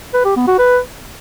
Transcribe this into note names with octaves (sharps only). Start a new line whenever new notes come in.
B4
G4
B3
F#4
B4